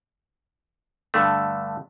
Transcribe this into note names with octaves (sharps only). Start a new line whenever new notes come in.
G2 D3 A3